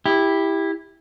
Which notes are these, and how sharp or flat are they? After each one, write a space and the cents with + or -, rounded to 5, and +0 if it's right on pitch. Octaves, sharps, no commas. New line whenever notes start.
E4 -5 G4 +15